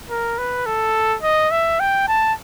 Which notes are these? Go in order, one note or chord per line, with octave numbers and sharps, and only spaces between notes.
A#4
B4
A4
D#5
E5
G5
A5